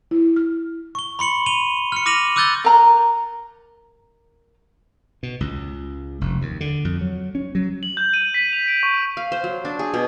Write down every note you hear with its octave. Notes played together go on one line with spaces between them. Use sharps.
E4
F6
C#6 G7
B5 C6 C#7 F#7
D#7 F7 G7
F6 C#7
D6 F6 A#6 D#7 F7 F#7
D6 E6 F#6 G6 A6 G7
A#4 A#5
B2
C#2
F1
D#2
D3
F2
F#3
C#4
F#3
F#7
G6
D#7
B6
F7
D7
C#6
F5
C5
F#3
D4
G#4
B2